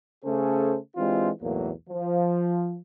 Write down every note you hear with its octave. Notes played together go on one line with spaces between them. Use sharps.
C#3 A3 C#4 G#4 A4 C5
E3 G#3 C4 D4 F4 G4
B1 E2 A2 F#3 A#3
F3